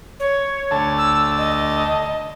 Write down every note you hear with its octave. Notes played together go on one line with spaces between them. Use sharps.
C#5
D2 A5
E6
D#5